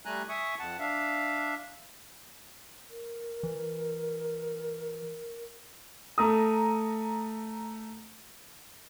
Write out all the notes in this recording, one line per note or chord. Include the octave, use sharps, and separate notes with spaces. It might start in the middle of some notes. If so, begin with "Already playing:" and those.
G3 A3 G#5 A#5 F#6
E5 G#5 C#6 D#6
F2 F#5 A5
D4 E5 F5
A#4
E3
A3 A#5 D#6